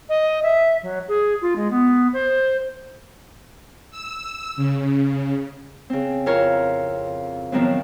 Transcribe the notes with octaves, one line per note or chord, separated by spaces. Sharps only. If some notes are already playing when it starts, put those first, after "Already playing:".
D#5
E5
F#3
G#4
F4
G#3
B3
C5
E6
C#3
C#3 C4
F2 E4 F4 A#4 C#5 F6
A2 D#3 F3 F#3 B3 C4